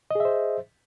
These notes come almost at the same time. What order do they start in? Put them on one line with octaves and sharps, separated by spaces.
D#5 G#4 E5 C5